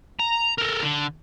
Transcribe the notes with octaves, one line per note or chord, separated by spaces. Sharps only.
A#5
A4 A#4
D3